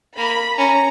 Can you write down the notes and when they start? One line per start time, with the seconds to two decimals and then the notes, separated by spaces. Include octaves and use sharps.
0.18 A#3 B5
0.58 C#4 A#5